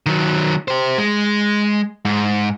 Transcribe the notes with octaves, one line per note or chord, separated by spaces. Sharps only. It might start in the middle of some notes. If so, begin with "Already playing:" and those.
D#3 F#3
G4 C5
G#3
G#2